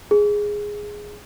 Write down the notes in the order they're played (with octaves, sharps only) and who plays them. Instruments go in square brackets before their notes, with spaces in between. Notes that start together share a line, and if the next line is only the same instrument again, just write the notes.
[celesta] G#4